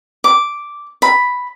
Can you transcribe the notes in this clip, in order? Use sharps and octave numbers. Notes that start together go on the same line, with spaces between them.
D6
B5